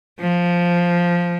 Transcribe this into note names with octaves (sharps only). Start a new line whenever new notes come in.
F3